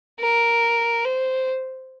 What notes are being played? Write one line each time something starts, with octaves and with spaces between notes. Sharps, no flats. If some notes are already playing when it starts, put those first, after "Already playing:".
A#4
C5